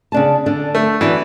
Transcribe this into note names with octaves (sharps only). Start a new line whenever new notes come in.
C#3 D4 A5
D3 D4
A3
E3 B3 D4 F#4